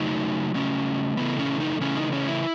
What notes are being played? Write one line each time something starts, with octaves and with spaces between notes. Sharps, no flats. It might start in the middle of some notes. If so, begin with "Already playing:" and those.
Already playing: C#3 F#3 A3 D#4
C#3 F#3 A3 C#4
C#3 E3 A3 B3
C#4
D#4
C#3 E3 A3 C#4
D#4
C#4
E4